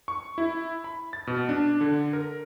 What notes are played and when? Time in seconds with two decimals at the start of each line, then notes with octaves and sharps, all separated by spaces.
0.08 C#6
0.38 E4
0.84 B5
1.13 A6
1.27 B2
1.49 D4
1.81 D3
2.13 A#4